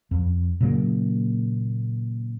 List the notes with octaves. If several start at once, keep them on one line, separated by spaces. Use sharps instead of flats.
F2
A#2 C#3 F#3 A#3